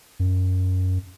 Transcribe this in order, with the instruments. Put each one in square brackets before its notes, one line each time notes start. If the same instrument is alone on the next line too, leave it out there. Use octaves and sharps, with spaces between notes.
[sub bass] F#2